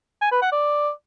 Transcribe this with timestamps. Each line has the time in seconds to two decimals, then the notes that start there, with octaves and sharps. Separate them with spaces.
0.22 G#5
0.32 B4
0.42 F#5
0.52 D5